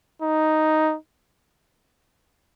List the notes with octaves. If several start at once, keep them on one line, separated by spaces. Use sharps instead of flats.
D#4